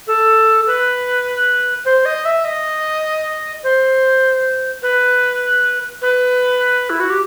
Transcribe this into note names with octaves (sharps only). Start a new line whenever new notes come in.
A4
B4
C5
D#5
E5
D#5
C5
B4
B4
E4
F#4
G4